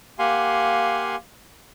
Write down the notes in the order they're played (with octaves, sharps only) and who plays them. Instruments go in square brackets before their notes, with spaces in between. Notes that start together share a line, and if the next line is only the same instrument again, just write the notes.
[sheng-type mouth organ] A#3 G4 F5 F#5 G#5 C6